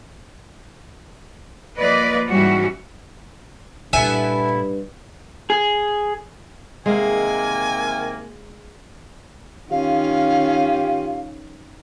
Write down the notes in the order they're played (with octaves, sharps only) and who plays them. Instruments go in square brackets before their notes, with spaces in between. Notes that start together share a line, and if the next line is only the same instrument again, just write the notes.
[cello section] F3 A#3 B4 D5 D#5
G#2 E3 G3 C#4 F#4
[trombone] G2 [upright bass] A#2 [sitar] B3 E4 A4 [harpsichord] E5 G#5
[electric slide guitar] G#4
[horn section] C3 D#3 A#3 [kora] G#3 [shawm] G#5
[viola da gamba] D#3 C#4 [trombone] F4 [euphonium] G4 [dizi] F5